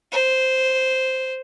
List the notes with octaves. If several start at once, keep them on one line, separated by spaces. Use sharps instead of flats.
C5